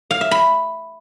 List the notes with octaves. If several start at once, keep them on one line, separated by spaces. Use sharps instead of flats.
F5
E5
B5